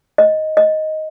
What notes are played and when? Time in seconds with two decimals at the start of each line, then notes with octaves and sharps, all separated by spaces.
0.18 D#5
0.57 D#5